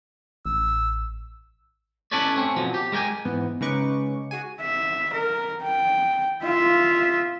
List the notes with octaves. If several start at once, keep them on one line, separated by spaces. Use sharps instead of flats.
A1 E6
C#4 E4 A4 B4 C#5 D5
A3 C4 C#4
B2 F3 F#3
G4
G#3 A#4 C#5 G5 G#5
G#2 E3 B3
C#3 G#3 D#4 B4 C#6 D6
F#4 G#4 G#5
E5
A#4
G5
F4 E5